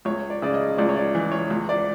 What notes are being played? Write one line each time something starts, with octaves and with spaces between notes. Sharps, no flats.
C#2 C#5
D5
C#3 D5
D#5
C#2 D5
C#5
D5
E3
C#5
C#2
D5